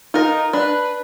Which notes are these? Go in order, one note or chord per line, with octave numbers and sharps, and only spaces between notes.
D#4 F4 A#4
D4 B4